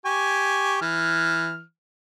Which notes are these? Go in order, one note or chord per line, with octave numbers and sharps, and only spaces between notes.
G4 G#5 C#6
E3 F6